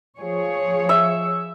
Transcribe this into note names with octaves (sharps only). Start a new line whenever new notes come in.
F3 G#4 C#5
E5